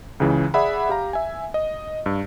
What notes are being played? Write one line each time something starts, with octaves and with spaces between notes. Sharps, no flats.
C#2 C#3 E3
G#4 D5 E5 F#5 B5
G4 F5 A#5
E5 G#5
D#5
G2